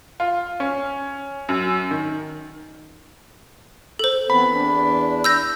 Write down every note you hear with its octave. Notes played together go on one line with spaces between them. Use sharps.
F4
C#4
F#2
D#3
A4 C5
E3 B3 C4 B5
E2 D4
E6 G6 A#6